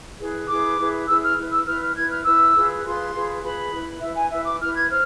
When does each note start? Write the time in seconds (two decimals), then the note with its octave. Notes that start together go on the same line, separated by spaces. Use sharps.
0.19 E4 G#4 B4
0.48 E4 G#4 B4 D6
0.78 E4 G#4 B4
1.07 E4 G#4 B4 E6
1.22 F6
1.37 E4 B4
1.51 E6
1.66 E4 B4 F6
1.81 F6
1.95 E4 B4 G#6
2.09 F6
2.24 E4 B4 E6
2.54 F4 G#4 B4
2.83 F4 G#4 B4 C6
3.14 F4 G#4 B4
3.42 F4 G#4 B4 B5
3.72 E4 B4
4.01 E4 B4 E5
4.16 G#5
4.31 E4 B4 E5
4.45 D6
4.60 E4 B4 F6
4.75 G#6
4.90 C5 F6